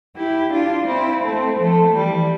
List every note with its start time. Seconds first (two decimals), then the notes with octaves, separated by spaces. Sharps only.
0.16 E4 G4
0.52 D4 F4
0.87 C4 E4
1.23 A3 C4
1.59 F3 A3
1.94 E3 G3